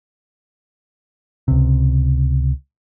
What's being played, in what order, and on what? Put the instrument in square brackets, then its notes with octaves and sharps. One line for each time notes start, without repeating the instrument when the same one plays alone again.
[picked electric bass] C#2 C3